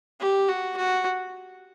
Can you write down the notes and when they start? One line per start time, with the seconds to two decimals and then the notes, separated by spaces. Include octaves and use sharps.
0.20 G4
0.48 F#4
0.76 F#4